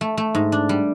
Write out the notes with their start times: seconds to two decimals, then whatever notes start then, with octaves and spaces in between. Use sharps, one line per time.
0.01 A3
0.17 A3
0.35 G#2
0.52 D4
0.69 G3